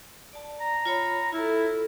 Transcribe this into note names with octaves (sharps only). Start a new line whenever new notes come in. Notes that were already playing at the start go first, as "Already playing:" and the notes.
D5 A5
A#5
F4 C#5 B5
E4 F4 A4